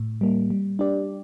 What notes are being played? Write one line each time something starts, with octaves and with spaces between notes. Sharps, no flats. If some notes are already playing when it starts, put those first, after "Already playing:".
Already playing: A2
G3 A#3
G3
D4 G4 D5